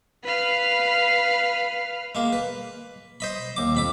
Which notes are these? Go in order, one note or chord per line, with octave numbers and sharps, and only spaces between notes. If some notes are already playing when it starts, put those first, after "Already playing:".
B4 F5
G#3 A#3
B4
C5 D#5 B5
D#2 D6
F2 B5 D6